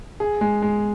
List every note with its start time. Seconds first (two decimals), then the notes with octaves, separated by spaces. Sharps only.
0.20 G#4
0.41 G#3
0.62 G#3